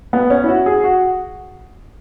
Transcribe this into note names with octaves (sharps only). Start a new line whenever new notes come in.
B3
C#4
E4
F#4
G#4
F#4